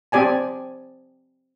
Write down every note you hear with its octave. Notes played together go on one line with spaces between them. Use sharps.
C4 G4 D5 G#5 A5